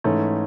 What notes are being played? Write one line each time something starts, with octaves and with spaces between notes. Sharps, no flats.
G#2 E3 A3 C#4